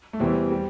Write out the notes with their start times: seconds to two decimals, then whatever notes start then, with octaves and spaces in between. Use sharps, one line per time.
0.13 A3
0.20 E2 C3 E3 G3 C4
0.51 G3